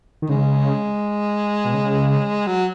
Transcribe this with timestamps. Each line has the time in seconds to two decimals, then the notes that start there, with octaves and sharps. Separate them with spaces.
0.22 D#3
0.29 C#3 G#3
1.65 B2
1.74 C#3
2.47 F#3